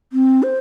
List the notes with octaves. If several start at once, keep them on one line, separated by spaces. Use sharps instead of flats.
C4
C5